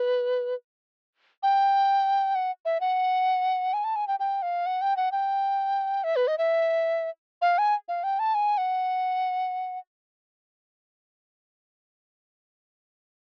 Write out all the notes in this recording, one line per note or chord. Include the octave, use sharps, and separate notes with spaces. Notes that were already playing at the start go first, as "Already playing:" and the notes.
Already playing: B4
G5
F#5
E5
F#5
G#5
A5
G#5
G5
G5
F5
F#5
G5
F#5
G5
E5
B4
D#5
E5
F5
G#5
F5
G5
A5
G#5
F#5